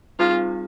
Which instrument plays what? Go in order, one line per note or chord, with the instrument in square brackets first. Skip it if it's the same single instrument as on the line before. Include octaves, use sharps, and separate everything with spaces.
[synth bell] G3 C4 D#4 G#4 [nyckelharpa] F4